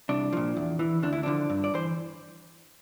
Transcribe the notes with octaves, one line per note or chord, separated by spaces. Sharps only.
C2 D4
A#2 F3
E2
E3
D2 D4
E4
D3 F3 D4
G2
D5
E3 C5